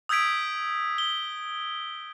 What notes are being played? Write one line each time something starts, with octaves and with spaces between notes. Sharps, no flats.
D#6 E6 G6 G#6 B6 D7
G7